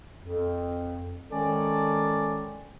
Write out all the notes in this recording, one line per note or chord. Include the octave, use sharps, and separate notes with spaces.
F2
D#3 G#3 C#4 A4 D5